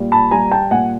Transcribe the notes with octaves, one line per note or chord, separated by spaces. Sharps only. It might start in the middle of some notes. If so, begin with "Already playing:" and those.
Already playing: A#2 G3
A5 B5
G3 G#5 A#5
G5 A5
A#2 F#5 G#5